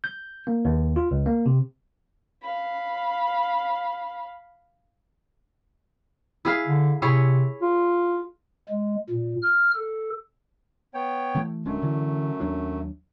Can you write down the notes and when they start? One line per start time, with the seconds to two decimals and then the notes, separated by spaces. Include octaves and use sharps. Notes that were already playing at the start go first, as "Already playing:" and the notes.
0.04 G6
0.47 A#3
0.65 D#2
0.96 F4
1.11 C#2
1.26 A#3
1.46 C3
2.42 F5 B5
6.45 E4 G#4 F5
6.67 D3
7.02 C3 E4 G#4 C#5
7.62 F4
8.68 G#3
9.10 A#2
9.42 F6
9.74 A4
10.94 B3 C#5 G5
11.35 E3 A3
11.65 D1 F#2 G#3 A3 D4
11.82 D3 E3
12.40 D#2 F#3 D4